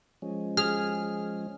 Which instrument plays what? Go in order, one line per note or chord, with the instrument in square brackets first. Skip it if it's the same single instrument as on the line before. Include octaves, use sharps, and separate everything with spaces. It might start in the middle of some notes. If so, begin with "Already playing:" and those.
[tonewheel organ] F3 G#3 C#4
[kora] G#4 [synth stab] F6